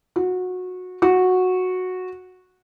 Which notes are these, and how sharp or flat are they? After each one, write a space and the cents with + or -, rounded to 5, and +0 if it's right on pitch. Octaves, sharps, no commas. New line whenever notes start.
F#4 -20
F#4 -10